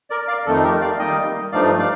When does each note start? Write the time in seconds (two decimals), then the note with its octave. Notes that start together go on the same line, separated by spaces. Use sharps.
0.10 A#4 D5
0.28 D5 F5
0.46 F2 D#3 A3 D#4 A4
0.64 G4 A#4
0.81 D5 F5
0.99 D#3 G3 A#3 D#4 D#5 G5
1.52 G2 F3 A3 D#4 D5 F5
1.79 D5 F5